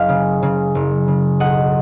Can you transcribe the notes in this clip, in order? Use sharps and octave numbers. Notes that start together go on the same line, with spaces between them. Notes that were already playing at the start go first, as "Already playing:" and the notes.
Already playing: F#1 D#5 F5
C#3
C#3
F#1
C#3
B1 D#5 F#5